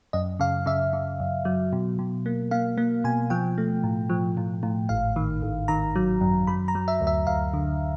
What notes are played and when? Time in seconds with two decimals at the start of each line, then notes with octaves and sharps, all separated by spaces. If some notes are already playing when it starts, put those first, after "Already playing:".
0.13 F#2 D#5
0.40 C#3 F5
0.66 C#3 E5
0.93 C#3
1.20 F#2
1.45 F#3
1.73 B2
1.99 B2
2.26 A#3
2.51 A#3 F5
2.78 A#3
3.04 B2 G#5
3.30 F3 G5
3.58 A3
3.84 A2
4.10 F3
4.37 A2
4.63 A2
4.89 G#1 F5
5.16 D#3
5.42 G#1
5.68 D#3 A#5
5.96 F#3
6.21 F#2
6.47 F#3 B5
6.68 A#5
6.75 F#3
6.88 E5
7.01 D2
7.07 E5
7.27 D2 F5
7.54 D3